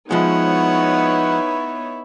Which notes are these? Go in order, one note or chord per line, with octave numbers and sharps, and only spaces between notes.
F3 G#3 B3 D#4 E4 C#5 F#5